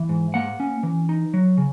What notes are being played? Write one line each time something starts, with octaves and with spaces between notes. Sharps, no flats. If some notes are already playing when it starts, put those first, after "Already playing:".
Already playing: E3
G#2
A#3 F#5
C#4
E3
D#4
F#3
C#3